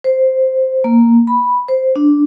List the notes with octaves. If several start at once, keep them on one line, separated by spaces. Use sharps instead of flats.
C5
A#3
B5
C5
D4